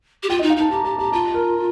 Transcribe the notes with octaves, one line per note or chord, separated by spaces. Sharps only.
G4
F4 G5
D#5
D#4
F5
D#4 A5
G4 A#5
G4 A5
G4 A#5
F4 A5
A#4